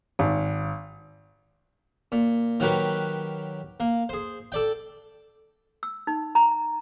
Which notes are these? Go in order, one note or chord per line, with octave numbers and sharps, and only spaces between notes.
G#1
A#2
D#3 F#3 F#4 G4 A#4 B4
A#3
G#4 C5
A4 D5 G5
E6
D#4
A#5